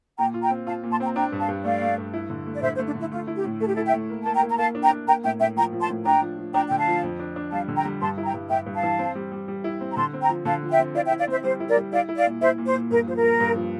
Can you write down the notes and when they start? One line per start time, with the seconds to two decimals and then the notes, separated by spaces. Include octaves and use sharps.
0.17 A#2 G5 A#5
0.34 F4
0.42 G5 A#5
0.50 C4
0.67 F4 F5 A5
0.83 A#2
0.91 A5 C6
1.00 C4 G5 A#5
1.16 D4 G5 A#5
1.32 G2
1.40 F5 A5
1.48 G2
1.64 A3 D5 F5
1.82 A3
1.97 G2
2.13 E4
2.30 D3
2.46 A3
2.54 D5
2.62 D3 C5 E5
2.75 C5
2.79 A3
2.87 D4
2.95 D3 E4
3.12 A3 F4
3.27 E4
3.36 G4
3.44 A2
3.60 A3 A4
3.68 G4
3.75 E4 A4
3.85 E5 G5
3.93 A3
4.10 A#3
4.23 A#3 A5
4.34 G5 A#5
4.42 A#3
4.50 A#5
4.58 A#3 F5 A5
4.75 D4
4.83 G5 A#5
4.91 D4
5.07 A#3 G5 A#5
5.24 A2 E5 G5
5.40 A2 E5 G5
5.56 F3 G5 A#5
5.73 F3
5.81 A5 C6
5.89 A2
6.05 D4 G5 A#5
6.21 F3
6.38 F3
6.54 D4 G5 A#5
6.68 D3 G5
6.79 F5 A5
6.87 F3
7.03 F2
7.19 D4
7.36 D4
7.52 G3 F5 A5
7.68 D3
7.77 G5 A#5
7.85 G3
8.01 G2 A5 C6
8.18 E4
8.25 G5 A#5
8.34 G2
8.50 G2 E5 G5
8.66 G2
8.74 F5 A5
8.83 E3
8.99 C4
9.15 G3
9.32 G3
9.48 G3
9.64 E4
9.81 C4
9.93 A#5
9.97 D3 A5 C6
10.13 C4
10.22 G5 A#5
10.29 F3
10.45 D3 F5 A5
10.63 F3
10.71 E5 G5
10.79 C4
10.95 E4 D5 F5
11.07 E5 G5
11.11 E4
11.19 D5 F5
11.28 C4 C5 E5
11.44 G3 C5
11.60 E4
11.68 A#4 D5
11.76 G3
11.93 E4 D5 F5
12.09 E4
12.17 D5 F5
12.26 A#2
12.41 E4 C5 E5
12.58 A#2
12.66 C5
12.74 A#2
12.91 G2 A#4
13.07 F3 C5
13.15 A#4
13.23 A#3
13.40 G2
13.55 F3